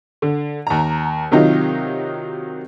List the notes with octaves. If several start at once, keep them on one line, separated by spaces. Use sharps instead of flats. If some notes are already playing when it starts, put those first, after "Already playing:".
D3
D#2 A#5
C3 D#3 F#3 D#4 F4 G4